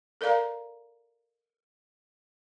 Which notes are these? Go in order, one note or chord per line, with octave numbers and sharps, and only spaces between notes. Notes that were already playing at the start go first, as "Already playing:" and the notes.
A4 A#4 D5 F5 A#5